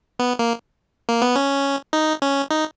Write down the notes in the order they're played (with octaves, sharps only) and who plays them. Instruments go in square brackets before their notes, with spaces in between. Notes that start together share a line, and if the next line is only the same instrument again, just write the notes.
[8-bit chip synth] B3
A#3
A#3
B3
C#4
D#4
C#4
D#4